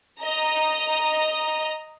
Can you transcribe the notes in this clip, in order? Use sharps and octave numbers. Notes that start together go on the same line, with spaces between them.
D#5 A#5